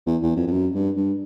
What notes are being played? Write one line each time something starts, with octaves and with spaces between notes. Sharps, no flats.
E2
E2
F2
F2
F#2
G2
G2